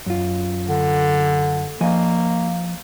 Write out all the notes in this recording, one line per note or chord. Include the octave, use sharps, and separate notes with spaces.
F#2 F4
D3
F3 A#3 D#5 G#5